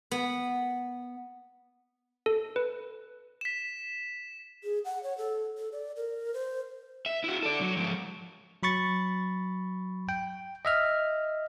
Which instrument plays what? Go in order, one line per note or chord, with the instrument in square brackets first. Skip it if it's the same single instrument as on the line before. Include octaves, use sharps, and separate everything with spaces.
[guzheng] B3
[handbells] A4
B4
[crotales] B6 E7
[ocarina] G#4
F#5
C#5
A4
A4
D5
A#4
C5
[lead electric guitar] E5
E4 F#4
A4 D5
F#3
G#2 F3
[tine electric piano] F#3 B5 C#6 A6
G5
D#5 E5 F6